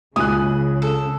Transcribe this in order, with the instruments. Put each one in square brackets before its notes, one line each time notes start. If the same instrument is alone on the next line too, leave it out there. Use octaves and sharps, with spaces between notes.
[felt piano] C#2 [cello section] C#3 [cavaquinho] G#5 [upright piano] D#6 F#6
[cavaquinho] A4